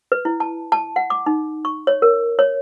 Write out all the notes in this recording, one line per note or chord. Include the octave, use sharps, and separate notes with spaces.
B4
E4
A5
A5
F#5
D6
D#4
C#6
C#5
A#4
C#5